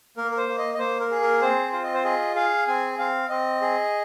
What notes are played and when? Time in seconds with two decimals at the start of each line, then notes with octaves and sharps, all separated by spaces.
0.17 A#3 A#4
0.31 A#4
0.37 C5
0.49 A#3
0.58 D#5
0.74 D#5
0.79 A#3 C5
1.00 A#4
1.11 G#4
1.22 A#4
1.42 C4 C5
1.73 F4 C5
1.83 D#5
1.94 C5
2.04 G#4 D#5
2.35 G#4 F5
2.68 C4 G#5
2.98 C4 F5
3.29 C4 D#5
3.61 G#4